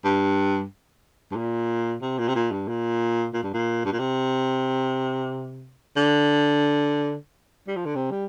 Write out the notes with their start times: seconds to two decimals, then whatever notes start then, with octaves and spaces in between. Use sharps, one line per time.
0.05 G2
1.31 G2
1.36 A#2
2.02 C3
2.19 A#2
2.28 C3
2.35 A#2
2.51 G2
2.68 A#2
3.34 A#2
3.43 G2
3.54 A#2
3.85 G2
3.93 A#2
3.99 C3
5.97 D3
7.68 G3
7.76 F3
7.85 D3
7.96 C3
8.11 G3